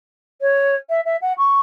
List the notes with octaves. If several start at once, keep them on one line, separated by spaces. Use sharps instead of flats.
C#5
E5
E5
F#5
C#6